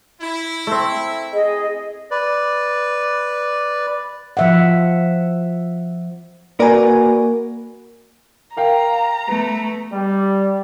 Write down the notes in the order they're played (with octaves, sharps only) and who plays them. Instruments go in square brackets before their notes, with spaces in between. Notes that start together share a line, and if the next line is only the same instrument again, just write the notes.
[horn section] E4
[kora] A3 C4
[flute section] G#4 D#5
[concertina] B4 D5
[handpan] F3 E5 F#5
[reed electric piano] A#3 [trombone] F#4 [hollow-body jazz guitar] A#4 B4 [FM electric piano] D5 G#5
[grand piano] A#4 F5 G5 [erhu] A#5
[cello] A3 [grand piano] B3
[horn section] G3